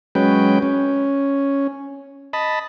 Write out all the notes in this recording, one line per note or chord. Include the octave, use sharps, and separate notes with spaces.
F#3 G#3 C#4 B4 G5
C#4
D#5 A5 B5